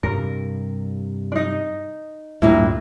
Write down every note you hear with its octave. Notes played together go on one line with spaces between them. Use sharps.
G2 C3 G3 A#4
D4 D#4
D2 G2 A#2 A#3 E4